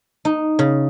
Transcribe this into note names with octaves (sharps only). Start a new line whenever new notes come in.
D#4
C#3